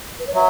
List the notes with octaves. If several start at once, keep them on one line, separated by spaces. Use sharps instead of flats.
B4
C#5
F#3 E5